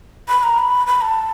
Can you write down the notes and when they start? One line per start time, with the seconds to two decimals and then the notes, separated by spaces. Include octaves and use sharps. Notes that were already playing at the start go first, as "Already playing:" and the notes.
0.28 B5
0.43 A#5
0.58 B5
0.87 B5
1.01 A5